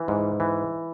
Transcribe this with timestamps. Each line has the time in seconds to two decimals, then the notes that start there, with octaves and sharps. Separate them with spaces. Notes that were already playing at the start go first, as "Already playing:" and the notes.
Already playing: E3
0.08 G#2
0.40 E3